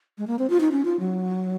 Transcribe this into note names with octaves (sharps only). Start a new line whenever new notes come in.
G#3
A#3
C4
F4
D#4
C#4
F4
F#3